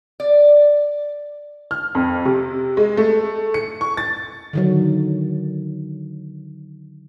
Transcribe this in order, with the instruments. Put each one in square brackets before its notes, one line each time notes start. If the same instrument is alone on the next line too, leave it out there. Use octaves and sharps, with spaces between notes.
[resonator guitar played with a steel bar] D5
[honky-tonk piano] F6
F2
C3
G#3
A3
C#7
C#6
A6
[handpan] D3 D#3 F#3